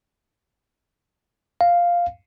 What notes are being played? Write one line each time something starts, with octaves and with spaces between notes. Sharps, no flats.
F5